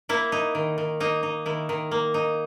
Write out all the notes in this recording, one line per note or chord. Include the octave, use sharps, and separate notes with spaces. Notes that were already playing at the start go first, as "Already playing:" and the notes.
A#3 E4
D#4
D#3
D#3
A#3 D#4
D#4
D#3 E4
D#3
A#3
D#4